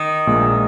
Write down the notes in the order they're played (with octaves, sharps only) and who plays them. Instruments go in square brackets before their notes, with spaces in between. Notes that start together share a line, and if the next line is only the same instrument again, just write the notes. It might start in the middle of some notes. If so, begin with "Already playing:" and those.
Already playing: [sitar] D#3
[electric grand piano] A#1 A#2 G#3